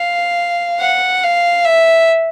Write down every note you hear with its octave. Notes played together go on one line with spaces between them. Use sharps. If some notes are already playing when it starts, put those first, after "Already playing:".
Already playing: F5
F#5
F5
E5